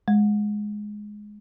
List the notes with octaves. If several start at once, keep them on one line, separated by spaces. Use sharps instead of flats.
G#3